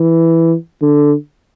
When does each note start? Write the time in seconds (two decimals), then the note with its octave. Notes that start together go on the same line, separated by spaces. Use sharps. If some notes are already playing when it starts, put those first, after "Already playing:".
Already playing: E3
0.82 D3